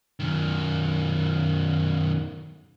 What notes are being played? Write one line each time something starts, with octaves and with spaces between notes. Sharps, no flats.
F#2 D#3